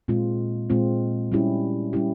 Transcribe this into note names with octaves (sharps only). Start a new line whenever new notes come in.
A#2 G#3 C4 F4
A#2 G#3 C4 F4
G3 C#4 E4 G4
G3 C#4 E4 G4